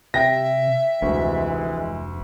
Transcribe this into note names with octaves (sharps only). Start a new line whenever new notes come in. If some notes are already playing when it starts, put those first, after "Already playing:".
C3 E5 G5 A#6
F1 D2 C3 E3 G#3